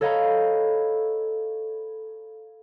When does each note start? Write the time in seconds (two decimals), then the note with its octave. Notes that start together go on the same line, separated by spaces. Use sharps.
0.01 A4 C#5 D#5 F5 A#5 B5